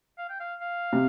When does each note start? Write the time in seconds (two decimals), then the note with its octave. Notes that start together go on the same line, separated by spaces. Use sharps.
0.18 F5
0.29 G5
0.40 F5
0.61 F5
0.93 C3